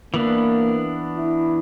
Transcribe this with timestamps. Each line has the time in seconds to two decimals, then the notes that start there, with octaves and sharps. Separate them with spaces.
0.14 E3 A#3 B3 D4
1.16 E4